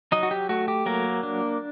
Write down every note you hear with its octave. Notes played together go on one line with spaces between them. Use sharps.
F#3 D#4 D#5
F#4
G4
A3 F#4
G4
F#3 A#3 A#4
D4